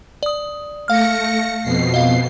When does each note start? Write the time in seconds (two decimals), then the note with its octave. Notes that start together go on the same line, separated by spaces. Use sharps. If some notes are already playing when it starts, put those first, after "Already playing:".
0.23 D5 D#6
0.88 A3 F5 F6 A#6 C#7
1.63 F2 B2 C7
1.94 D#5 F5